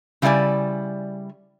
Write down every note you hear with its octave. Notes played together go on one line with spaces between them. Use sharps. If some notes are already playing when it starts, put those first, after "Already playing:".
C#3 G3 E4 G#4 D5 G#5